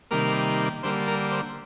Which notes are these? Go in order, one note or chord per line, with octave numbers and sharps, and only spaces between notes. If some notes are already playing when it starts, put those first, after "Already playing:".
C3 D#3 G3 A#3 A#4
D3 G3 A#3 C5
A#4
C5